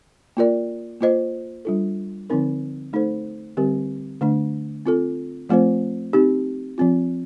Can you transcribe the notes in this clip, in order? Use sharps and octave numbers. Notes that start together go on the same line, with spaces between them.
A#3 F4 A#4 D5
A#3 F4 C5 D#5
G3 D4 F4 A4
D3 F3 C4 D#4 A#4
A3 D#4 A4 C5
D3 G3 C4 G4 A#4
D3 A3 D4
C4 F4 A4
F3 A3 C4 F4 C5
C4 D#4 G4
F3 C4 F4